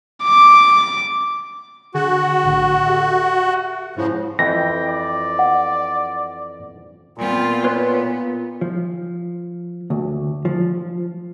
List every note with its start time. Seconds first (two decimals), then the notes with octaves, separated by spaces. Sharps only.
0.24 D6
1.94 D3 F#4 G#4 G#5
2.43 A#1 A2 D3
2.85 G4 A4 E5
3.96 G#2 C#3 F3 E4 A#6
4.39 F2 E3 G5 A#6
4.87 D5
5.39 F#5
7.18 A#2 B3 C4 F4
7.64 B3 F4 B4 C#5 C6
8.61 F3
9.90 D2
10.45 F3